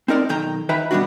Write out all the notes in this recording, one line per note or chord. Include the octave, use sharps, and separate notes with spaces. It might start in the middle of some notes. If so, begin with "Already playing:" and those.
C4 D#4 A#4 D5
B1 D#3 G5 A#5
D#3 B4 E5 G5 A#5 B5
B2 G3 A#3 B3 D4 F#4